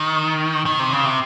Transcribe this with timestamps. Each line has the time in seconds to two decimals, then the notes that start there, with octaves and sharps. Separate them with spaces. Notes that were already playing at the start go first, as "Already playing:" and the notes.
Already playing: D#3
0.66 D#3
0.79 C3
0.93 C#3
1.05 C3